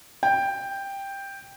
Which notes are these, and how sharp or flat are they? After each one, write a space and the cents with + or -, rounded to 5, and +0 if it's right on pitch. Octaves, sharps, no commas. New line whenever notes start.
G5 +5